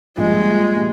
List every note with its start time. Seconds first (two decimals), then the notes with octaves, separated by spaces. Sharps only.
0.18 A#1 A#2 G3 G#3
0.76 A#2 G3